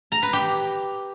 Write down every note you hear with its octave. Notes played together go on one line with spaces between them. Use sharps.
A#5
B4
G4